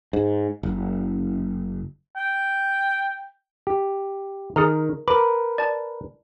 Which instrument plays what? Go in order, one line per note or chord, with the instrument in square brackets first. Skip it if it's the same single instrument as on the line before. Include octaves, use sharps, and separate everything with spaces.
[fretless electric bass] G#2
F#1
[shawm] G5
[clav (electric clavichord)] G4
[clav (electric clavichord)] D#3 [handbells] G#4 A#4 A#5
[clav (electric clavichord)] A#4 B4 [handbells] B5 D6
[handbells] D5 A5